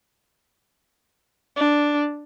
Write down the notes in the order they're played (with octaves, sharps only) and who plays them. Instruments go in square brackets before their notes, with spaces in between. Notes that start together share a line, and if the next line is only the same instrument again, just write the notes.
[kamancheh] D4